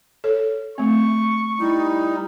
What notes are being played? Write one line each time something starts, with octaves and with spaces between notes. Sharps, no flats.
A4 C#5
A3 C4 C#6
G3 D#4 E4